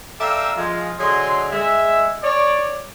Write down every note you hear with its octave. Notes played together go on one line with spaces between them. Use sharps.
A4 D5 E5 F5 G5 A#5
F3 G#3 F4
D3 F#3 G#4 D#5 C6
G#3 E5
C#5 D5